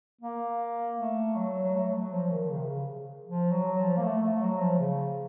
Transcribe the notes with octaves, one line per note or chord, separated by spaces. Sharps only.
A#3
A3
F#3
F#3
A3
F#3
F3
D#3
C#3
C3
C#3
F3
F#3
F3
A#3
A3
A3
F#3
F3
C#3